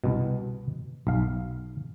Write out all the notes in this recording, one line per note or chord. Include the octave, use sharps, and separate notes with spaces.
C2 B2
B1 F5